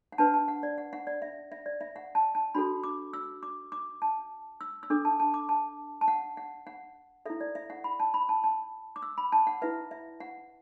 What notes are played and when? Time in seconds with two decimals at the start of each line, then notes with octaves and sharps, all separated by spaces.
0.12 F#5
0.18 D4 B4 A5
0.34 A5
0.48 F#5
0.63 D5
0.78 F#5
0.93 F#5
1.07 D5
1.22 E5
1.52 E5
1.66 D5
1.81 E5
1.96 F#5
2.15 A5
2.35 A5
2.54 D4 F#4 A4 B5
2.84 D6
3.13 E6
3.43 D6
3.72 D6
4.02 A5
4.61 E6
4.83 E6
4.90 D4 A4 D6
5.05 A5
5.20 A5
5.34 D6
5.49 A5
6.01 A5
6.08 F#5
6.37 F#5
6.67 F#5
7.26 E4 A4 E5
7.41 D5
7.55 E5
7.70 F#5
7.84 B5
8.00 A5
8.14 B5
8.29 A5
8.44 A5
8.96 D6
9.02 E6
9.18 B5
9.32 A5
9.47 F#5
9.62 E4 B4 E5
9.91 E5
10.20 F#5